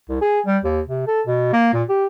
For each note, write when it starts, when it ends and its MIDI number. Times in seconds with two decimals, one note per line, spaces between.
0.09 0.18 36
0.22 0.40 68
0.46 0.58 55
0.64 0.81 39
0.88 1.06 48
1.07 1.22 69
1.27 1.51 47
1.53 1.73 58
1.74 1.83 46
1.89 2.06 67